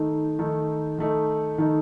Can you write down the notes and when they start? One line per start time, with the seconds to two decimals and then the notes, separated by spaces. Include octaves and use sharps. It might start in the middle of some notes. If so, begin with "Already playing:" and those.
Already playing: D#3 A3 D#4
0.39 D#3 A3 D#4
0.98 D#3 A3 D#4
1.58 D#3 A3 D#4